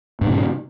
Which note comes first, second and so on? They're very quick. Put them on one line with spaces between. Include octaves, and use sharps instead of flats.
G2 A#2 C#3